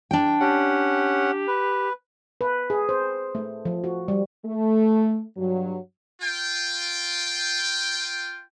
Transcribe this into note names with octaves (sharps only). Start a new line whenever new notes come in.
D4 G5
C#4 G4 F#5
B4
B4
G#4
C5
A3
F3
F#4
G3
A3
G2 F#3
F4 G5